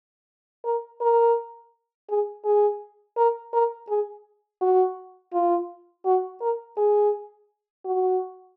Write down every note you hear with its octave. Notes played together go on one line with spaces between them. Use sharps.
A#4
A#4
G#4
G#4
A#4
A#4
G#4
F#4
F4
F#4
A#4
G#4
F#4